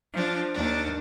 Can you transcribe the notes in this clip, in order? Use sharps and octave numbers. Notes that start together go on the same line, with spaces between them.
F3 D4
D#2 D4